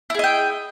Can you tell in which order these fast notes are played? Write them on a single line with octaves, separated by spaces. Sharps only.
E4 G#4 D#5 G5